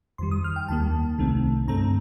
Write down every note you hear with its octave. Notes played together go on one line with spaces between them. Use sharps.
F2 D#3 G3 C6
D#6
F6
G5
D#2 D#3 G3 A#3 A5
C2 C3 D#3 A3 C4
G2 D3 A3 C4 A#5